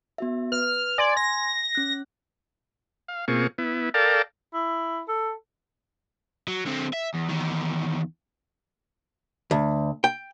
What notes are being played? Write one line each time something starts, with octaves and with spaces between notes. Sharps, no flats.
B3 F#4 E5
B4 F6
D5 G#5 C6 G#6
A#6
C#4 F#6
F5
B2 A#3 C4 F4 G#4 C#6
B3 E4
A4 A#4 D5 F5 G5 A5
E4
A4
F#3
D3 C4
E5
E2
E2 D#3
D2
G5